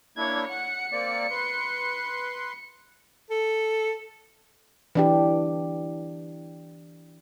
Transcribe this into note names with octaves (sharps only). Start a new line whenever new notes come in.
A#3 D4 E4 C#5 G#6
F#5 C#7
A#3 C4 D5
B4 C6
A4
E3 D4 G4